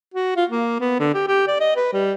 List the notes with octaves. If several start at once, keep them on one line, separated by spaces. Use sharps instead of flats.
F#4
F4
A#3
B3
D3
G4
G4
D5
D#5
B4
G3